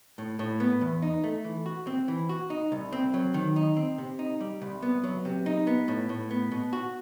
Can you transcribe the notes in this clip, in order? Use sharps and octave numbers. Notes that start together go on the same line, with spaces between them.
A2
A2
B3
E2
D#4
A3
E3
F#4
C4
E3
F#4
D#4
C2
C4
F#3
D#3
D#4
C4
C3
D#4
G3
C2
B3
F#3
C3
D#4
B3
A2
A2
B3
B2
F#4